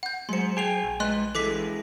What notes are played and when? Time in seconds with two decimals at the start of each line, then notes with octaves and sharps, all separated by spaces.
0.03 F#5 G6
0.29 F#3 G#3 C5 C6 C#7
0.57 G#4 G5 G#5 C7 F7
0.84 A#1
1.00 G#3 B4 D#5 C6 F#6
1.35 E3 G3 G#3 A4 D6 B6